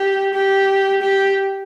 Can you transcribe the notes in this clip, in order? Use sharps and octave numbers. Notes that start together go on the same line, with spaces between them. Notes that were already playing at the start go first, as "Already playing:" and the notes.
Already playing: G4
G4
G4